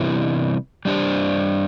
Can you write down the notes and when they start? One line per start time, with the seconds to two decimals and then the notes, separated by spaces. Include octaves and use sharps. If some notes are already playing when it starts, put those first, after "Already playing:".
Already playing: C3 E3 G3 B3 E4
0.85 G3 D4 G4 C5